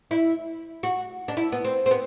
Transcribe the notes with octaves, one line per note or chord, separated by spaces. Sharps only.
E4
F#4
D4
E4
B3
C4
C4
B3